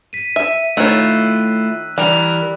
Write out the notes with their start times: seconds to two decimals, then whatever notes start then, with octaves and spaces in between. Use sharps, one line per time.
0.13 B6 D#7
0.36 E5 D#7
0.77 D#3 A3 E4 F4 C#5 E6 F#6
1.98 E3 G3 A#4